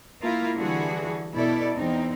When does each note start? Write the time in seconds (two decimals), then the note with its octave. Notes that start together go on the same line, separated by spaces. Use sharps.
0.21 A#3 E4 F4 A#4
0.58 D3 E3 G3 F#4 G#4
1.33 B2 E4 A4 D5
1.75 E2 C4 D#4